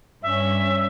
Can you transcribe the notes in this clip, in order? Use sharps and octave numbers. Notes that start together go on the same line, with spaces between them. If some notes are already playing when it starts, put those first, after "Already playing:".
G2 C#4 E5